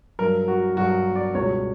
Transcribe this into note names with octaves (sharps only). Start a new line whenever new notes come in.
G2 F#3 A#4
F#4
G2 F#3 F#4
D5
C#2 B2 G3 C#5